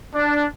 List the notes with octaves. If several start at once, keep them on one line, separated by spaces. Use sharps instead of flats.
D4